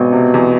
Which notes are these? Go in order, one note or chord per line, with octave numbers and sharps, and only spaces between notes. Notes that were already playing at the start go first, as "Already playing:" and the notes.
Already playing: G#1 B2
C3
E2